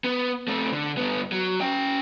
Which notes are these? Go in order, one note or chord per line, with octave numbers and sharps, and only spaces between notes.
B3
A3 C4
D3
G2 B3
F#3
C#4 G5